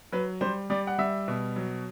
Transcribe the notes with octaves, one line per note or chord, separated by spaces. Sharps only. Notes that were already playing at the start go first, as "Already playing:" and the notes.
F#3 B4
G3 C5
G3 D5
F#5
G3 E5
B2
F#3